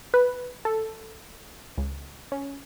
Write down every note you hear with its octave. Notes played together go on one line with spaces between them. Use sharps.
B4
A4
C#2
C#4